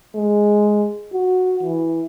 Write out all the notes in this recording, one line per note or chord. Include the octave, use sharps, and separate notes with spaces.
G#3
F#4
E3